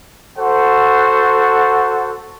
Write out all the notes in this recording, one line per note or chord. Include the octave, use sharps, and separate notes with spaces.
F#4 A4 C5 F#5